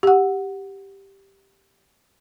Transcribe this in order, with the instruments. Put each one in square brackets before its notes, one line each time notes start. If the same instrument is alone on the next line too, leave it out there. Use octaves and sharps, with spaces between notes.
[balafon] G4 F#5